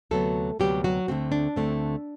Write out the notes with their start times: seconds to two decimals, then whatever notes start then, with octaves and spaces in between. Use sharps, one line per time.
0.11 D2 C3 F#3 A3 B3 A4
0.60 D2 C3 F#3 G3 B3 G4
0.84 F#3 F#4
1.08 D2 D3 A3 C4
1.32 D4
1.56 D2 D3 A3 C4